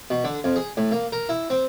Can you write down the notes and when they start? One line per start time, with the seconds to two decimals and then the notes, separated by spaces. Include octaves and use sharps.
0.10 B2
0.24 D3
0.44 F2
0.56 G#4
0.77 A2
0.92 A#3
1.12 A#4
1.29 E4
1.50 C4